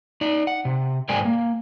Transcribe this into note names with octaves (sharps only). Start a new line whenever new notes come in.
D#4 D5
F#5
C3
G#2 G#3 A#4 D5 G5 G#5
A#3